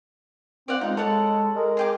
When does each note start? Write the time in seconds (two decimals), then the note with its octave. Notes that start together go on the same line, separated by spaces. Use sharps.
0.68 C4 D5 F5 F#5
0.81 G#3 D#4 F4
0.97 G#3 A4 C#5 F#5 A5
1.56 G#3 A#4
1.77 G#4 G5 D6